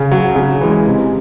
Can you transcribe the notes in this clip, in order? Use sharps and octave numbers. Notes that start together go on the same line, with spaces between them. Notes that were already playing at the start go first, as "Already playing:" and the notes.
Already playing: C#3
F#3
C#3
E3 G#3
C3